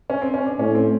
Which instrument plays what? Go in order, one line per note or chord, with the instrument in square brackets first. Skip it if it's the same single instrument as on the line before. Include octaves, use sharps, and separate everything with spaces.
[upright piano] C#4
C4
C#4
D4
[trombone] A2 [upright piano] C#4
[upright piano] C4